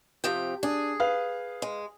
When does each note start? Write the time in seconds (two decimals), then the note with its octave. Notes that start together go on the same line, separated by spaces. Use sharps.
0.24 C3 F3 G5
0.63 D4 G#4
1.00 B4 F5
1.62 G#3